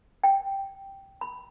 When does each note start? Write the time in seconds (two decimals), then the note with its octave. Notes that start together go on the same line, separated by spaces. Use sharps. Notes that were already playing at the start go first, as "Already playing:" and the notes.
0.24 G5
1.21 B5